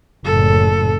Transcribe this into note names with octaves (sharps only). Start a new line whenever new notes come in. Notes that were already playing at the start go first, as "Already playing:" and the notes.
F#1 A2 A4